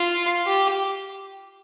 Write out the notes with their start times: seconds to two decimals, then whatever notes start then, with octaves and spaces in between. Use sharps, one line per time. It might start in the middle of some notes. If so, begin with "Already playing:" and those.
Already playing: F4
0.46 G4